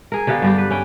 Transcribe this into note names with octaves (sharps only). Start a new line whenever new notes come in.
G#4 A#4
D3 B3 G4 F5
G2 G3 G4
B4
C#4 G5